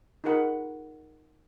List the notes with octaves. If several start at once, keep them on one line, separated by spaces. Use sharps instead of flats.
D#4 F4 G#4 A#4 F#5 B5